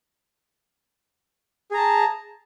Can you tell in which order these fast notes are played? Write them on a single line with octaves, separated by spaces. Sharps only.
G#4 A#5 A5